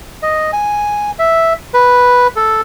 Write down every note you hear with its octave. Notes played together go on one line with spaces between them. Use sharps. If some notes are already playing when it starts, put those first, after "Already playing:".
D#5
G#5
E5
B4
A4